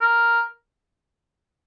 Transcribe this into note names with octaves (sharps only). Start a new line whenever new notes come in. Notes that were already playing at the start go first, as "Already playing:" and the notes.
A#4